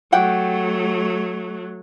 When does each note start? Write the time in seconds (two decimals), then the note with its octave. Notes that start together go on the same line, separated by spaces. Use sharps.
0.12 F#3 A3 G4 F#5 G5